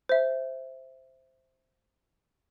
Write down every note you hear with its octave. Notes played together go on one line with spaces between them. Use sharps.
C5 E5